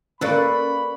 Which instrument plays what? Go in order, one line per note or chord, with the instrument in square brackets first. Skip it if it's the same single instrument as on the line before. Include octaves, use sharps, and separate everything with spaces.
[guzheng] A#3 A4 [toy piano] C#4 [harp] B4 D5 C#6 [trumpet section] B5